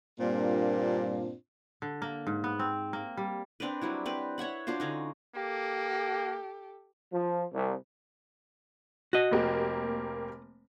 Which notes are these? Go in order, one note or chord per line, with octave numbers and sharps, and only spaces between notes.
G2 A#2 A#3 C4 D4 F4
D3
A#3
G#2
B3
C4
A#3
G3
C4 D4 A#4 B4
F#3 G3 E4
C4 G4 B4
C#5 E5 F#5 B5
D4 F4 F#4 C5
D3 C#4 D#4
A#3 G4 A4
F3
C2
F#4 D#5
F1 A#3 G4